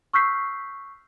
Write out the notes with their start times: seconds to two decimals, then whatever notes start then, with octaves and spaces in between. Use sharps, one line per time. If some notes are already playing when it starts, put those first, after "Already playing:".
0.14 C#6 E6 F6 G6 B6 C7